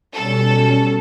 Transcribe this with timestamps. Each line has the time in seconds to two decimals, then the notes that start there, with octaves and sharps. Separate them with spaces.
0.14 B2 G3 C#4 A4